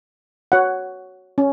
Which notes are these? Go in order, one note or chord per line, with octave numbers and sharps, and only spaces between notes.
F#4 C#5 F#5
C#4